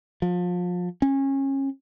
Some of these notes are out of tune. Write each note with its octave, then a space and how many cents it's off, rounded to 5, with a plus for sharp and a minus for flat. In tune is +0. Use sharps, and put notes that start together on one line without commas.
F3 +30
C#4 -25